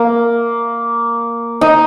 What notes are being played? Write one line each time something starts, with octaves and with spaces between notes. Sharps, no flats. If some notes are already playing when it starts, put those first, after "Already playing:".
Already playing: A#3
D#4